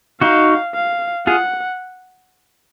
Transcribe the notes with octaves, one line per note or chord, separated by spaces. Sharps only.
D#4 F#4 F5
F5
F4 G#4 F#5